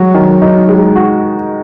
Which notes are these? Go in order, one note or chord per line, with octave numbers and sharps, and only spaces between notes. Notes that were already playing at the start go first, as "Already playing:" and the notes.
Already playing: F#3 G#3 F#4
D#3
D#4
G#3
F#4